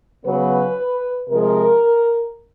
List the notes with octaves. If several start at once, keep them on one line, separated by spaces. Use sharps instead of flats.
C#3 F#3 B3 B4
C3 F3 G#3 A#4